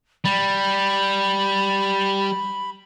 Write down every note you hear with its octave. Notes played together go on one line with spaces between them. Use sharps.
G3 B5